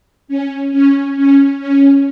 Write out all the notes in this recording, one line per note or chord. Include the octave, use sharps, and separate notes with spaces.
C#4
C#4
C#4
C#4